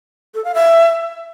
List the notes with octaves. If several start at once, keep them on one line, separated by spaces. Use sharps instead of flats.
A4
F5
E5